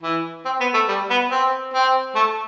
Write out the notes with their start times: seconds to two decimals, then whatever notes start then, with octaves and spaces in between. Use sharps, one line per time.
0.03 E3
0.45 C4
0.60 B3
0.74 A3
0.88 G3
1.10 B3
1.31 C4
1.74 C4
2.15 A3